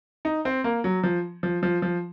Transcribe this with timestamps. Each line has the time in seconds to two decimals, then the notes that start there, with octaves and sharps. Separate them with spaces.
0.25 D#4
0.45 C4
0.64 A#3
0.84 F#3
1.03 F3
1.43 F3
1.63 F3
1.82 F3